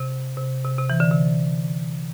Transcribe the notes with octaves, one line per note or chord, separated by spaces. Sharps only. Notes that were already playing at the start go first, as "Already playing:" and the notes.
Already playing: C3
C3
C3
C3
E3
D3
C3